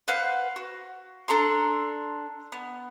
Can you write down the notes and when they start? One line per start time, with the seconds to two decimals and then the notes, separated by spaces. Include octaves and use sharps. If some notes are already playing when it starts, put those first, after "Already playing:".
0.08 B4 C5 F5 F#5
0.56 F#4
1.28 D4 A4 A#5 C6
2.52 B3